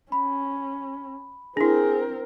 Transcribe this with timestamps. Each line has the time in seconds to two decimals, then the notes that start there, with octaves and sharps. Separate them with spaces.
0.12 C#4 B5
1.57 C4 D4 E4 G#4 A#4